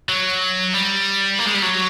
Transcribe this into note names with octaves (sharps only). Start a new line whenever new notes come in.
F#3
G3
A#3
G#3
G3
F#3